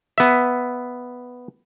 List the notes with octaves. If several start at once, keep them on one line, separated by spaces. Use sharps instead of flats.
B3 E5